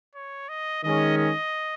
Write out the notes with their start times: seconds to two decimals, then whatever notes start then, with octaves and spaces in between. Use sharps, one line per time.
0.15 C#5
0.49 D#5
0.83 D#3 G#3 C#4 D#5
1.17 D#5